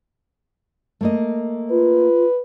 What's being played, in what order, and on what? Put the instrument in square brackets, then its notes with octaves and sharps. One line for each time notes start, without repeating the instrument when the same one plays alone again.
[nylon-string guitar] A3 A#3 D#5
[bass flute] F4 [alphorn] B4